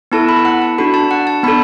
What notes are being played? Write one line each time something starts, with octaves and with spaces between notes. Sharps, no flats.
B3 E4 A4 A5
B5
F#5
A5
D4 F#4 A4 B5
A5
F#5
A5
B3 D4 A4 B5